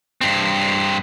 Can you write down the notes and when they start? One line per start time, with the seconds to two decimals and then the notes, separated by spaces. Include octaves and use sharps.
0.21 G2 C4